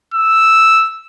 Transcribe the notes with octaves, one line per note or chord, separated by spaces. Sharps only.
E6